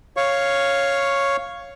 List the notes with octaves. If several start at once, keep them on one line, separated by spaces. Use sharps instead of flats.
C#5 F5 C#6